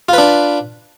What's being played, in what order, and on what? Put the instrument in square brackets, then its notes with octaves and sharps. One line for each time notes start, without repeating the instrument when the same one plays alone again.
[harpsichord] F4
B4
D4